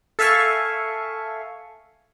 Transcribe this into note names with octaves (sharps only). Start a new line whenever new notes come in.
A4 E5 F5 G#5 C#6